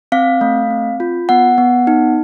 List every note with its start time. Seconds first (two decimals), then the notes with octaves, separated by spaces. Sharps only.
0.12 C4 F5
0.41 A3
0.70 C4
1.00 F4
1.29 B3 F#5
1.58 B3
1.87 D#4